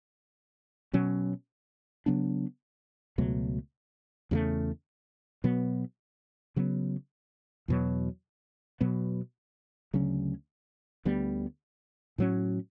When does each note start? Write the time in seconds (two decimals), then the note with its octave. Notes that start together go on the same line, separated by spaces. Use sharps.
0.93 B2 F#3 C#4
2.06 C#3 F#3 B3 D4
3.18 C#2 B2 F#3 A3
4.31 E2 C#3 F#3 A3
5.44 B2 F#3 B3
6.56 C#3 F#3 B3
7.68 E2 B2 F#3
8.81 B2 F#3 B3
9.94 D2 C#3 F#3 C#4
11.05 D2 D3 G3 B3
12.18 A2 F#3 C#4